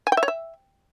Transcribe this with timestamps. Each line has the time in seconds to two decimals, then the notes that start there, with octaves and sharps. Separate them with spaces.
0.07 G#5
0.12 G5
0.17 E5
0.23 C#5
0.28 E5